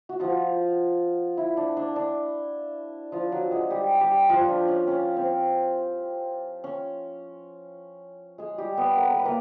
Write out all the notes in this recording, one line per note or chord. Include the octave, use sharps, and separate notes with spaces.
F#4
F3 F4
E4
D4
D4
D4
F3 F4
F#3 F#4
G#3 G#4
G3 G4
G3 G4
F3 F4
D4
C#4
C#4
C4
C#4
G#3 G#4
G3 G4
B3 B4
A#4
B4
A#4
B4
A#3 A#4